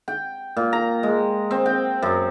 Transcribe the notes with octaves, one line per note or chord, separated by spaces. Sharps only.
G5
A#2
A#5
G#3
C4
G5
F#2